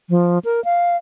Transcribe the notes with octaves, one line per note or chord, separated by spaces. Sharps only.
F3
A#4
F5